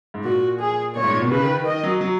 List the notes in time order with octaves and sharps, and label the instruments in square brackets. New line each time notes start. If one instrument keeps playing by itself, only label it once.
[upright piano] G#2
[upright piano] A#2 [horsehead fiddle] F#4
[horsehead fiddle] G#4
[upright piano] A#2 [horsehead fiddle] C#5
[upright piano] G#2
A#2
B2
[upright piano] C#3 [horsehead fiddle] B4
[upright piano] D#3
D#3
[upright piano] D#3 [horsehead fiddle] D#5
[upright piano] F#3
F#3